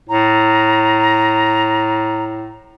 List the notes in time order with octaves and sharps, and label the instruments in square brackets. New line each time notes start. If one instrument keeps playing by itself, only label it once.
[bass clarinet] A2 [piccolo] A#5